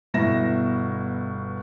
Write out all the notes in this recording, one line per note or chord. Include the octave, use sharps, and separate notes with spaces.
G1 B2 E4 A#6 E7